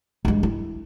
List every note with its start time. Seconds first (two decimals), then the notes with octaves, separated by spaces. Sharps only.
0.25 G2 G#3
0.43 E4